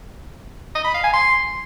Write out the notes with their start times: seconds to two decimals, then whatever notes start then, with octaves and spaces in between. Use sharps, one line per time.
0.75 D#5
0.85 B5
0.94 F5
1.04 G#5
1.14 C6